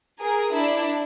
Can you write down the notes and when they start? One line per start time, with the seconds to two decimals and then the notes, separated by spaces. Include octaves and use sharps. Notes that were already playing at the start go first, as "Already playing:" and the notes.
0.20 G#4 A#4
0.54 D4 E4